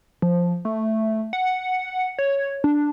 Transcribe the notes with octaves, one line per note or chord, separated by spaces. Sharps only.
F3
A3
F#5
C#5
D4